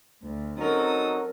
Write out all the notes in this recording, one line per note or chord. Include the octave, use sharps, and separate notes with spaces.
D2
F#3 C4 C#4 D#4 A4 A#4 D#6